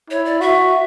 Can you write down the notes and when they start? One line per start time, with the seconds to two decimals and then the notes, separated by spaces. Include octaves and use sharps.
0.10 E4 C#5
0.25 D5
0.41 F#4 E5